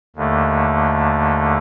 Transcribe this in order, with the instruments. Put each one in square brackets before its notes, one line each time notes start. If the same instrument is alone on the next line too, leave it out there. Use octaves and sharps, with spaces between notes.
[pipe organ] D#2 D3 A3